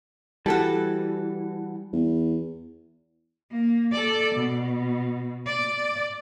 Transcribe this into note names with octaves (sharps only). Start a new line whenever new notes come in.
E3 G3 F#4 A4 A5
E2
A#3
A4 D5
B2
D5